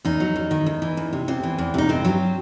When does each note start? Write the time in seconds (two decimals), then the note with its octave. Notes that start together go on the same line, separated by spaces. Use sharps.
0.05 E2 D#4
0.20 F#3
0.36 E2
0.51 D#3
0.66 E2
0.82 E3
0.97 E2
1.13 C3
1.28 E2 C4
1.43 E3
1.58 E2
1.74 C3 D#4
1.89 G2 C4
2.05 F#3